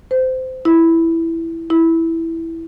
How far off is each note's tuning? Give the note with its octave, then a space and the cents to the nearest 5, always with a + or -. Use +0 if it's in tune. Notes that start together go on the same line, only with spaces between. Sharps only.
C5 -20
E4 +0
E4 -5